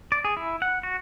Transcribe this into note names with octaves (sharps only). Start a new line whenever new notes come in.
D5
G#4
E4
F#5
F#4